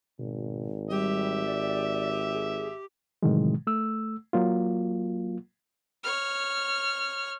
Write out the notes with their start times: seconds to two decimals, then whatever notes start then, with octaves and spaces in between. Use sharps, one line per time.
0.19 G#1 B2
0.90 G3 G4 E5
1.46 D5
2.34 G#4
3.23 A2 C3 D#3 E3 F#3 G#3
3.67 A3 E6
4.33 F#3 A#3 F4
6.03 C#5 F6